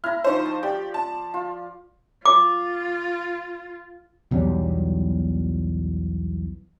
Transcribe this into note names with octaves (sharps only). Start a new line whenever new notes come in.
E4 A#5 F6
F3 D#4 C5 C#6
A5
G4 D5
A5
F4
F4 D6
B1 E2 F#3 G3